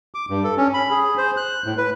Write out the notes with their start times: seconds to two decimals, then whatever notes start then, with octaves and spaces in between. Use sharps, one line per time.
0.15 D6
0.30 G2
0.44 A4
0.58 C#4
0.74 B5
0.90 G#4
1.17 C5
1.37 F#6
1.66 A2
1.78 B4